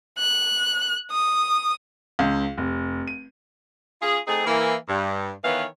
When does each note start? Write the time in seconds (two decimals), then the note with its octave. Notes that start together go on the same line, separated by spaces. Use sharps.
0.18 F#6
1.11 D#6
2.19 C#2
2.58 F1
3.08 D#7
4.01 C#4 F4 G#4
4.26 A3 C4 D#4 G#4
4.46 E3 A#3
4.88 G2
5.43 D#3 E3 B3 C#5 F5